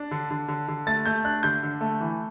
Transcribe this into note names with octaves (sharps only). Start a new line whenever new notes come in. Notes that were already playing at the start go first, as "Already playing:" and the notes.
Already playing: D4
D3
D3
D3
D3
A3 A6
A3 G6
D4 F#6
D3 G6
D3
A3
E3